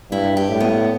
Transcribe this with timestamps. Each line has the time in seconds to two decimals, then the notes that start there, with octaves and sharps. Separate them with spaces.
0.11 G2 E4
0.37 G4
0.49 A2
0.60 B3